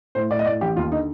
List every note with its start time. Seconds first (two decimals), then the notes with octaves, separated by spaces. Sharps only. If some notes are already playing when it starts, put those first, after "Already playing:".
0.15 A2 C5
0.31 A2 D5
0.39 D#5
0.46 A2 D5
0.61 A1 G4
0.76 D#2 F4
0.92 D3 D#4